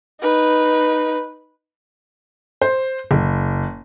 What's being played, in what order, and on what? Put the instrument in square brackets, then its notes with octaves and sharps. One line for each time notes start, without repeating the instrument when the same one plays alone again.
[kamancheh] D#4 B4
[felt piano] C5
F#1